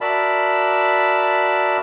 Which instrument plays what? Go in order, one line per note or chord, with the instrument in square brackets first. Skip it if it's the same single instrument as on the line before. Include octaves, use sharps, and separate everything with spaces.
[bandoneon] F#4 A#4 D5 E5 A5 B5